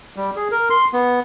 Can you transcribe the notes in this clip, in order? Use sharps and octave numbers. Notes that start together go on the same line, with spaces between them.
G3
G#4
A#4
C6
B3